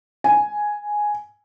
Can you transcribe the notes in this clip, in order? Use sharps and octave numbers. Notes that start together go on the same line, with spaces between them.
G#5